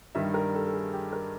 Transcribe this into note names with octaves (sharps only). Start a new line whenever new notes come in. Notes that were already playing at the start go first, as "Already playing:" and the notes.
G2 D#3 G3 E5
A#4
A4
A4
G#4
G4
A#4